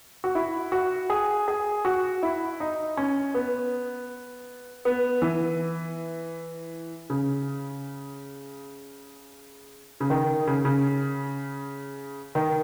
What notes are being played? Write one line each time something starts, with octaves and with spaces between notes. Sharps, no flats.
F#4
E4
F#4
G#4
G#4
F#4
E4
D#4
C#4
B3
B3
E3
C#3
C#3
D#3
C#3
C#3
D#3